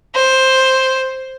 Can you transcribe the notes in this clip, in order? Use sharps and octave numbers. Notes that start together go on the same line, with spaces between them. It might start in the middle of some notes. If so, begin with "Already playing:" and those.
C5